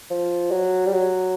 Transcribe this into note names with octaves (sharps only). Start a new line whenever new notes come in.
F3
F#3
G3
F#3